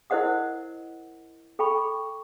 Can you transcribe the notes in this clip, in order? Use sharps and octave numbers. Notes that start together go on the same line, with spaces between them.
E4 A#4 C5 D#5 F#5 D#6
A4 G5 B5 C#6
D6